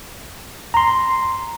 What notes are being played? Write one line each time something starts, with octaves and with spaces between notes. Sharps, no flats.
A#5 C6